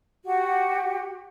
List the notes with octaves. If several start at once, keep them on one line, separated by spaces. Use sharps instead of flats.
F#4 G4 F#5